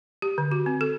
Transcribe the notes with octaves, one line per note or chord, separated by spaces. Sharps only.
G4
D3
F#4
C4
A4